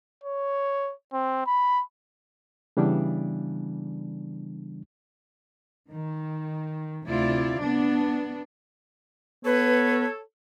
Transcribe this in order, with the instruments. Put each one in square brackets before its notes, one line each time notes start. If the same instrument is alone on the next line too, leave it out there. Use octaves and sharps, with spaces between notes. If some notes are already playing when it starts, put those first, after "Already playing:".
[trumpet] C#5
C4
B5
[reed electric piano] C#3 E3 G3 B3 D4
[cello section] D#3
D2 C3 E4 F4 D5
B3 D4
[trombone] B3 [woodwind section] A4 C#5 [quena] B4